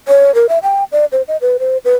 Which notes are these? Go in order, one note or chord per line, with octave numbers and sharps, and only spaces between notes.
C#5
A#4
E5
G5
D5
C5
D#5
B4
C5
B4